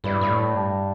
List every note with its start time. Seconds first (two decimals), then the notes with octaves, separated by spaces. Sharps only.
0.04 G2 E4 B4 D5
0.21 G2
0.29 A2
0.54 G2